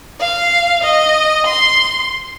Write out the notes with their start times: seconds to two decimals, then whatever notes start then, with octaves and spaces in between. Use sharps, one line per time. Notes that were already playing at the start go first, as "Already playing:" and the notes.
0.20 F5
0.83 D#5
1.46 C6